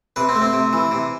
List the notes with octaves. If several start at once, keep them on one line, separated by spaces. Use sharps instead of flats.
C3 B4
C4
A3
C4
C3
E3
C3